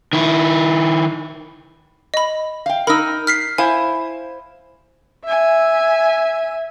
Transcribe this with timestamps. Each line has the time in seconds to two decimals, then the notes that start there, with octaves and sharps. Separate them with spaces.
0.13 D#3 E4
2.14 D#5 B5
2.66 F5 G5
2.87 D#4 A#4 B5 E6
3.27 F6 B6 C7
3.58 E4 C5 F5 G#5
5.24 E5 G#5